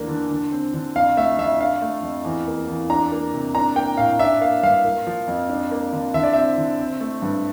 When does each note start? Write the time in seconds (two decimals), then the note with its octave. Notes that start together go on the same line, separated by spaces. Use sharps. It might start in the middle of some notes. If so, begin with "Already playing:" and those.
Already playing: E2 A#3 D4
0.08 D3
0.31 D3
0.52 C4
0.74 D3
0.95 F2 F5
1.17 A3 E5
1.38 F2 E5
1.61 D4 F5
1.82 A3
2.03 F2
2.24 E2
2.47 A#3
2.68 E2
2.90 D4 A#5
3.12 A#3
3.33 C3
3.55 D4 A#5
3.76 A#3 G5
3.97 A2 F5
4.19 D4 E5
4.41 A#3 F5
4.63 G2 F5
4.85 A#3
5.07 F3
5.28 F2
5.49 D4
5.71 A#3
5.93 D3
6.14 D3 E5
6.23 D5
6.33 C4 E5
6.58 D3
6.79 C4
7.01 A3
7.22 G2